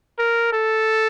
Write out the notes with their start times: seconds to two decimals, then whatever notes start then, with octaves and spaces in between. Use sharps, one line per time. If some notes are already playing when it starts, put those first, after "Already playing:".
0.19 A#4
0.53 A4